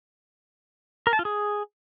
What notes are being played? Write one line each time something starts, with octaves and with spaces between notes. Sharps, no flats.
A#4
A5
F4
G#4